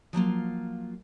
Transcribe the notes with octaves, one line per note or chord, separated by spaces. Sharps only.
F3 F#3 A#3 F4